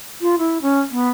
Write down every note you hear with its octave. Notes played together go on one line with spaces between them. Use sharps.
F4
E4
C#4
B3